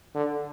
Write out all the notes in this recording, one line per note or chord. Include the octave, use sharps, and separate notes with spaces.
D3